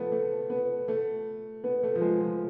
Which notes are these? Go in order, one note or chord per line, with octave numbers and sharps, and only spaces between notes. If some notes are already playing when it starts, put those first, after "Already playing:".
Already playing: F3 A3 B3
A3
B3
A3
B3
A3
F3
G#3
F3